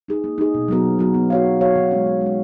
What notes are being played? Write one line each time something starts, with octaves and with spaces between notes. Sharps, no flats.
D#4 G#4
A#3
D#4 G#4
B2
F#3 B3 F#4 A#4
B2
F#3 B3 F#4 A#4
B3
F#4 C#5 F5
B3
F#4 C#5 F5
D#3
G#3 C#4
D#3
G#3
C#4